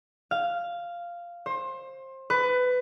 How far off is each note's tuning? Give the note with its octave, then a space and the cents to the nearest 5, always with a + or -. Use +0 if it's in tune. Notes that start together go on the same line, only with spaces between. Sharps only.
F5 -5
C5 +25
B4 +20